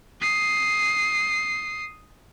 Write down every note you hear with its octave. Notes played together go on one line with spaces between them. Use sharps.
D#6 C7